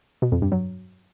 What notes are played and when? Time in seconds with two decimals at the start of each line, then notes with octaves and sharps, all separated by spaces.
0.22 B2
0.32 F2
0.42 G2
0.52 F#3